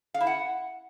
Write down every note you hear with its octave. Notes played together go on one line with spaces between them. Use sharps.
F5
E4
F#5